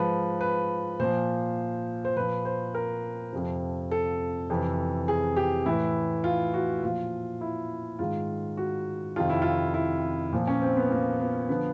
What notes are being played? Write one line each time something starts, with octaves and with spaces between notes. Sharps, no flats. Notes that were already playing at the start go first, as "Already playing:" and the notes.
Already playing: G#2 F3 B4
B4
A#2 F3 C5
C5
A#2 F3 B4
C5
A#4
F2 C3 F3
A4
F2 C3 E3
G#4
G4
A2 E3 E4
F4
F#4
A#2 F3 F4
E4
G#2 D#3 F4
F#4
F2 C3 D#3 F4
E4
F4
E4
A#2 F3
C#4
C4
B3
A#3
B3
D3 F3 B3